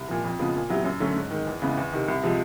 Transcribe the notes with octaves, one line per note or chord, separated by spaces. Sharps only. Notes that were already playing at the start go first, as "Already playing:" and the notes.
Already playing: C2
A#2 F3
F2
C#3 F3 G#3 B3
A#2
F#3 B3 E4 G4
F#2
D3 F#3 A3 C#4
G#2
D#3 G#3
E2
C#3 E3 G#3 B3
E2
C3 D#3
C2
C3 F3 G#3